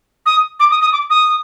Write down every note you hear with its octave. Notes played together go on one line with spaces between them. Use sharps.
D#6
D6
D#6
D#6
D6
D#6